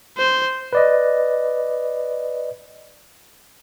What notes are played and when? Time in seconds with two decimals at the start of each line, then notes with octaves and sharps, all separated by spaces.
0.18 C5
0.73 B4 D5 D#5